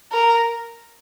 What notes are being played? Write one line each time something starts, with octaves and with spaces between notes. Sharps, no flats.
A#4